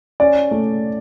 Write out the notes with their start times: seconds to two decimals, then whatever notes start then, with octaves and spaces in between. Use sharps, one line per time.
0.20 C#4 D5
0.51 A3